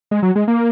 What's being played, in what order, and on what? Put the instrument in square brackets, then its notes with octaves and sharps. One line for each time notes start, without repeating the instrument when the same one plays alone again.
[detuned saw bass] G#3
F#3
G#3
A#3